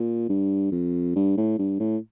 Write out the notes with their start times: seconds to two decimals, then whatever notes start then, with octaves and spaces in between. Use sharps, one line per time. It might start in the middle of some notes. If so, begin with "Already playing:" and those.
Already playing: A#2
0.29 G2
0.72 F2
1.16 G2
1.37 A2
1.59 G2
1.80 A2